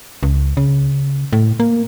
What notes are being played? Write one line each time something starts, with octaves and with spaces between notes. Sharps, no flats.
C#2
C#3
A2
A#3